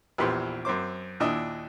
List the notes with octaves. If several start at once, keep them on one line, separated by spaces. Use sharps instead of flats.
A#1 E2 F3 G4 B4 C6
F#2 C4 C5 D6
D#2 A#2 D4 E4 D#5